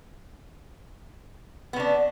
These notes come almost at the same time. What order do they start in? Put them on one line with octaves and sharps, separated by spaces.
B3 C#3 D4